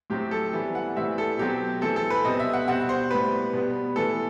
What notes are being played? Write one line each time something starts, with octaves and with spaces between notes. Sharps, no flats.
A2 F#3 C4 G4
A4
E3 G3 B3
F#5
A2 E3 G3 C4 E5
A4
B2 F#3 C4 G4
E3 A3 C4 A4
A4
B4
B2 G3 C4 D#5
E5
F#5
B2 G3 C4 F#5
C5
A2 G3 B3 B4
B2 G3 B3
A2 E3 B3 A4